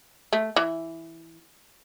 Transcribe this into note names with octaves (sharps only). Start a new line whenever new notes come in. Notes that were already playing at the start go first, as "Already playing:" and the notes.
A3
E3